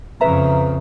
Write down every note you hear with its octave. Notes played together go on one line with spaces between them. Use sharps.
F2 C#3 B4 E5 A#5